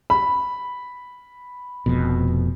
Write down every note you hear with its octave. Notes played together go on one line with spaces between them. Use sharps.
B5
F1 F2 B2